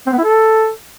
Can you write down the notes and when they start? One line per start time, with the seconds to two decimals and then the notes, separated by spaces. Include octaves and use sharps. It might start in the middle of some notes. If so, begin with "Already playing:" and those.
0.07 C4
0.13 B3
0.18 E4
0.24 A4